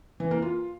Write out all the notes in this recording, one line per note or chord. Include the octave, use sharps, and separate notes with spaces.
E3
A#3
F4